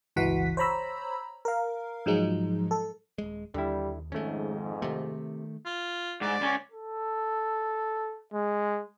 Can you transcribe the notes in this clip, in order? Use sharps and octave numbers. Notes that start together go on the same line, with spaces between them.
G1 C#2 E3 F#4 F#5 B6
C5 C#5 A#5 B5 E6
A#4 F5
G#2 F3 F#3 G#3 D#4
A4
D#1 G#3
D#2 D3 G3 E4
F2 G#2 D#3 G#3 A3 C#4
C3 D#3 A3
F4
G#2 D5
C#2 C#4
A4
G#3